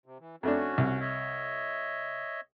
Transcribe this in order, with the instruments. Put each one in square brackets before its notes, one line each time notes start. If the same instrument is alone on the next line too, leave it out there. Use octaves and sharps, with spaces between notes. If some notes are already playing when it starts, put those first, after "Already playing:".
[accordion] C3
E3
[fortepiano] F2 A3 D4 [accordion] C#4 F#4
[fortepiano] C2
[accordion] C#5 D#5 E5